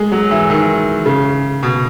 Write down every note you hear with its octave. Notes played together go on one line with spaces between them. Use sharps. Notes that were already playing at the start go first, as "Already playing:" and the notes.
Already playing: G#3
F#3
E3
D#3
C#3
B2